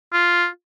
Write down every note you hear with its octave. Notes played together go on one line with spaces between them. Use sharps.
F4